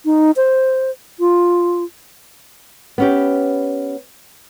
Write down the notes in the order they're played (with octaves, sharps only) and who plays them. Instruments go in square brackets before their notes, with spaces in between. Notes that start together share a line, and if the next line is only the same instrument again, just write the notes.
[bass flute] D#4
C5
F4
[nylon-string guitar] B3 C#4 G4